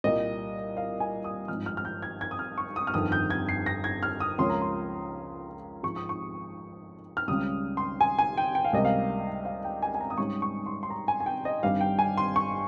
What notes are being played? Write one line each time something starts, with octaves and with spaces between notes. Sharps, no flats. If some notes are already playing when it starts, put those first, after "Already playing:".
C2 A#2 G3 D#5
F5
G#5
D#6
G#1 G2 F3 F6
F6
F6
G6
G#6
G#6
D#6
F6
C#6
D#6
F6
G1 F2 D#3 D#6
G6
G#6
C7
A#6
G#6
F6
D#6
C#2 C#3 F3 A#3 C#4 C6
A#5
C6
G#2 F3 G#3 C#6
D#6
C#6
F6
C#2 C#3 G3 D#6
C6
G#5
G#5
G5
G5
F5
C#2 C3 G3 A#3 D#5
F5
F5
G5
G#5
G#5
A#5
D#6
G#2 G3 C#4 C#6
C#6
C6
C6
A#5
G#5
G#5
G5
D#5
G1 G2 D#3 G3 C4 F5
G5
G#5
C6
C#6